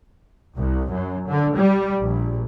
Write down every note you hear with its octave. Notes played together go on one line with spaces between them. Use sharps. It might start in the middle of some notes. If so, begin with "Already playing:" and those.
C2
F#2
D3
G3
A#1